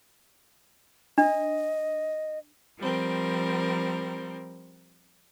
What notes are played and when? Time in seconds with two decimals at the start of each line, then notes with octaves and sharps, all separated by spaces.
1.18 D4 D#5
2.79 F3 G3 C4 A#4